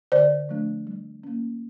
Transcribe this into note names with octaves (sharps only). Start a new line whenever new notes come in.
D3 C5 D5
F3 A3 D4
G3
A#3 C#4